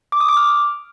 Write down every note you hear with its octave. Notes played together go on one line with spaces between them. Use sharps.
D6
D#6
D6
F6